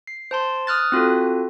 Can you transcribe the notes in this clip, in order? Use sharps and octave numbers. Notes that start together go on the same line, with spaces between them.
C7
C5 A5 C6
D#6 F6 F#6 A6
C4 F4 F#4 A4